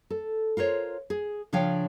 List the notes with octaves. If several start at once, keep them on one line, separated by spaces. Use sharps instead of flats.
A4
F4 A#4 C5 C#5
G#4
C#3 F3 D4 C#5 F5 G5